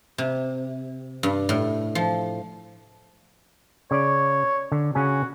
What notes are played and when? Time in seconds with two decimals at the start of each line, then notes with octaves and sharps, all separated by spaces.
0.18 C3
1.23 G2
1.49 A2
1.95 F3
3.91 C#3 C#5 D5
4.72 D3
4.95 C#3 C#4 F#4 G#5